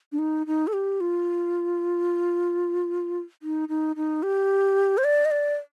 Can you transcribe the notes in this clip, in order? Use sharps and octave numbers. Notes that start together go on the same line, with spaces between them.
D4
D#4
D#4
A4
G4
F4
D#4
D#4
D#4
G4
C5
D5
D#5
D5